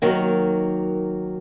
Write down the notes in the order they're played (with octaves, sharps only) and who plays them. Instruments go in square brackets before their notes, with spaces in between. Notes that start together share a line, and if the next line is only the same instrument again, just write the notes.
[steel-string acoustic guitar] D#3 F#3 A#3